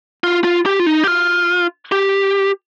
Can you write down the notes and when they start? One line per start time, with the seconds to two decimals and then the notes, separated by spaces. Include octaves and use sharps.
0.24 F4
0.44 F4
0.66 G4
0.79 F4
0.86 D#4
1.04 G4
1.07 F4
1.92 G4